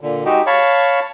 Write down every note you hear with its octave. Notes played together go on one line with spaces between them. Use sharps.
A#2 D3
G#3 D#4 F#4 G4
C#5 F5 A5 B5 C#6